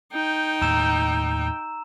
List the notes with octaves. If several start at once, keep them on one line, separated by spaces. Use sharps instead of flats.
D#4 G5
D#2 A2 A#5 E6 E7